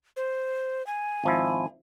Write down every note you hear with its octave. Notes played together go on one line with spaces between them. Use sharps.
C5
G#5
G#1 F3 E4